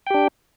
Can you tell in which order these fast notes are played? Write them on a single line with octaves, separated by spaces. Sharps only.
G5 G4 D4